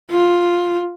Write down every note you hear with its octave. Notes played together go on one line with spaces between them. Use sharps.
F4